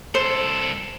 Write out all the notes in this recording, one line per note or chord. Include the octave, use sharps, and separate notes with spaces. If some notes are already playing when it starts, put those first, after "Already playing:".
C2 A4 C5